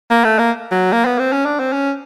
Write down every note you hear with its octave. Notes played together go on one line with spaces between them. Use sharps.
A#3
A3
A#3
F#3
A#3
B3
C4
C#4
D4
C4
C#4